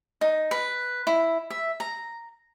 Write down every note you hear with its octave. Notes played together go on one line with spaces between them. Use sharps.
D#4
B4
E4
E5
A#5